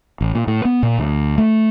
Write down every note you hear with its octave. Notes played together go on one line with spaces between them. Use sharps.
A1
A#2
A2
B3
A#2
D2
A3